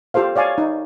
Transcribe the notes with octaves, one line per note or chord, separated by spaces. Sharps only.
F4 G4 A4 C5 F5
C#5 D5 F5 G#5
D#4